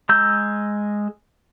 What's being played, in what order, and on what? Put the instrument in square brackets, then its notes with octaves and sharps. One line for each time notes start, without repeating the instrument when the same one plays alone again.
[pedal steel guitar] G#3 A#5 E6 G6